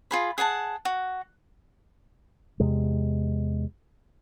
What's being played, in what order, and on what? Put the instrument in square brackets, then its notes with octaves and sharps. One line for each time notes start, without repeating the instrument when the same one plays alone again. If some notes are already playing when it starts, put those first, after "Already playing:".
[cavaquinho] F4 G#4 B5
G#4 F#5 G#5 A5
F#4
[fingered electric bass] E2 C3 G#3